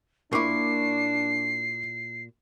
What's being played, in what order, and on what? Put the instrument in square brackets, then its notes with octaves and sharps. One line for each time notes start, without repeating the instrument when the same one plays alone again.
[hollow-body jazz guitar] A#2 E4 [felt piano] A#3 C#6 D6 [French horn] D4 [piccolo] C7